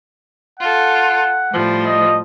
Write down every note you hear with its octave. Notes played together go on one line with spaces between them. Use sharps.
F4 A4 F#5
A2 F3 G3
D#5